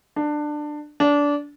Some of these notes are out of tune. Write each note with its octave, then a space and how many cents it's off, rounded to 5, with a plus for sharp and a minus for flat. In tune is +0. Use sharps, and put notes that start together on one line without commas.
D4 +20
D4 -20